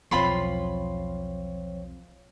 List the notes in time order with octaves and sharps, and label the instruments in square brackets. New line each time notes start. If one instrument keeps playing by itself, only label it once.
[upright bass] B1 E2 [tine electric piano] F3 C4 C#5 [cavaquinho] F4 B5 C6